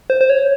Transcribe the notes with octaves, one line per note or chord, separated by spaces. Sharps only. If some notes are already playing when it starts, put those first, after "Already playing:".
C5
C5
C#5